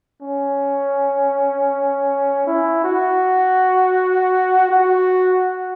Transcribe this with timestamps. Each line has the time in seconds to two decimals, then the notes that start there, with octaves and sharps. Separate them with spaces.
0.22 C#4
2.47 E4
2.84 F#4
4.71 F#4